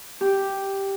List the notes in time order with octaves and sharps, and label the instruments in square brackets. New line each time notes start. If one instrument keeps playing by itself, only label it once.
[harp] G4